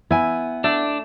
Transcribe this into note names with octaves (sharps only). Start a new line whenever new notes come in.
B3 E4 G#5
A3 D4